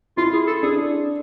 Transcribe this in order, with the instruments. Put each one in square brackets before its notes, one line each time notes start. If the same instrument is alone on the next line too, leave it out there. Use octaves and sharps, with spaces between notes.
[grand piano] E4 [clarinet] F4
[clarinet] G#4
A4
[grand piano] D4 [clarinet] G#4